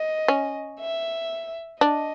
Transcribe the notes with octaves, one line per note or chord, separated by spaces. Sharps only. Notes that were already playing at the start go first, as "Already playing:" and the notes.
Already playing: D#5
C#4
E5
D4 D#5